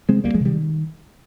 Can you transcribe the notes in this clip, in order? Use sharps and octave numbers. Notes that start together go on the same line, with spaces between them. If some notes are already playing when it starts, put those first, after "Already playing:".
C3 G#3 C4
D2 G3 A#3
F3 G#3
C3 D#3 G3